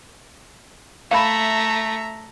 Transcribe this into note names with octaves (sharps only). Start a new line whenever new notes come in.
A3 E5 F5 A#5 B5